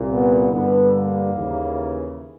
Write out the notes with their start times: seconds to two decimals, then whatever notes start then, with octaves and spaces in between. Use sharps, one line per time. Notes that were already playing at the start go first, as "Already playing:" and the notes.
Already playing: C2 A#2
0.10 B3
0.50 G2 D3 B3
0.91 A#3
1.32 D#2 C#3 E3